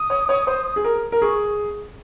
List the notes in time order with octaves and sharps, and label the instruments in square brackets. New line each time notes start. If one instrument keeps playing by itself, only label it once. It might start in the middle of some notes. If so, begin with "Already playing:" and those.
Already playing: [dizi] D#6
[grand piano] C#5
C#5
C5
G#4
A#4
A#4
[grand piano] G#4 [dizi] C#6